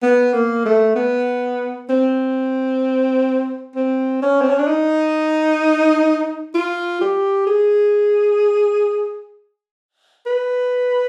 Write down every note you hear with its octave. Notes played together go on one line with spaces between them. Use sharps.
B3
A#3
A3
B3
C4
C4
C#4
C4
C#4
D4
D#4
F4
G4
G#4
B4